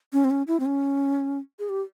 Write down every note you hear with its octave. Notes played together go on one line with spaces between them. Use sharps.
C#4
C4
C#4
E4
C4
C#4
G#4
G4